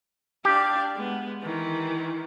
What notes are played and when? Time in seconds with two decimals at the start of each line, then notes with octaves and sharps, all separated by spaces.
0.45 D4 G4 F5
0.95 G#3 B3
1.42 D#3 E3